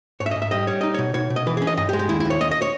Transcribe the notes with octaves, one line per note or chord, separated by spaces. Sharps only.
G#2 C#5
E5
D#5
G#2
E5
G3 D#5
G3 C#5
D#4 D#5
B2 C#5
B2 C#5
B2
D#5
E3 B4
G#4
C#4
D#5
G2 D#5
G4
G#3
G4
D#2 E4
E4
D#2
C#5
D#2 D#5
D#5
C#5